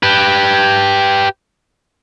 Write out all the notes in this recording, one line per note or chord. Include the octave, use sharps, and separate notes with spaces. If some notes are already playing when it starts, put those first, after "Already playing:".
G4 B4